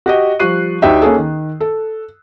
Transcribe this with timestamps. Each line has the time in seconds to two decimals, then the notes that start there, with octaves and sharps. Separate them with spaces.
0.06 F#4 G4 D#5
0.39 F3 G3 C#6 F#6 C7 D#7
0.82 D2 D4 D#4 G4 E5 G5
1.02 A#3 C#4 G#4 A4
1.16 D#3
1.60 A4